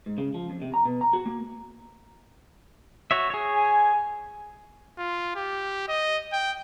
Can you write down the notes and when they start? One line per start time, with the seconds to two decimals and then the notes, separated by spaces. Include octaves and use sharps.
0.06 G#2
0.18 C#3
0.34 F3
0.50 F2
0.62 C3
0.74 A#5
0.85 B2
1.01 A#5
1.13 F#4
1.26 A#3
3.11 F#4 C#5 E5
3.30 G#4 C#5
3.56 G#5
4.98 F4
5.35 G4
5.88 D#5
6.32 G5